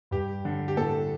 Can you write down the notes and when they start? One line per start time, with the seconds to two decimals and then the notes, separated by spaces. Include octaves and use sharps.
0.11 G2 G4
0.45 D3
0.68 G4
0.77 A2 A4